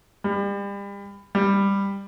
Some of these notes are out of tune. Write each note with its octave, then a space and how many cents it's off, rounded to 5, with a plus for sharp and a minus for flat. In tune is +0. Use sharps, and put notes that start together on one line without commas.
G3 +35
G3 +15